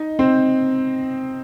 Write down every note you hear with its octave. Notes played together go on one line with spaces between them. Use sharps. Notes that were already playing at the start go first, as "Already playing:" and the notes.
Already playing: D#4 D#5
C4 C5